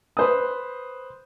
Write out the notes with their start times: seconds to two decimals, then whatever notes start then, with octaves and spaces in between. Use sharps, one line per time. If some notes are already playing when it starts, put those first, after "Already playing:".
0.17 B4 C5 D#6